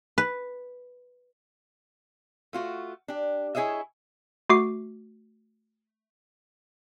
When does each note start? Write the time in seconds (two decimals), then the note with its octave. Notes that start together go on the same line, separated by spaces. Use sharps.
0.18 B4
2.53 A3 F4 F#4
3.08 D4 G4
3.55 E4 G#4 C#5 D#5 E5
4.49 A3 F#4 D6 C7